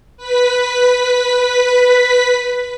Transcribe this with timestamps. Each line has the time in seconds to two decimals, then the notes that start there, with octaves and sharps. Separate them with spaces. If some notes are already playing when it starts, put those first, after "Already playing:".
0.17 B4 B6